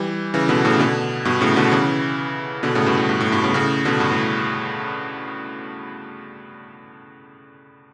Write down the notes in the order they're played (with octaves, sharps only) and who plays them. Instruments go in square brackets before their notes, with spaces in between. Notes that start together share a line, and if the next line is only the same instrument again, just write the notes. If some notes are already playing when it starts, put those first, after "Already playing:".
Already playing: [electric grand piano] E3 G3
C#3 E3
B2 D3
A2 C#3
B2 D3
G2 B2
A2 C#3
B2 D3
C#3 E3
B2 D3
A2 C#3
G2 B2
A2
G2
A2
G2 B2
A2 C#3
A2 C#3
B2 D3
G2
A2